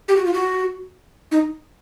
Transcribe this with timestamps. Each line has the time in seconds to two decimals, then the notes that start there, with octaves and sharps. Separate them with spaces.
0.08 G4
0.16 F#4
0.25 F4
0.34 F#4
1.31 D#4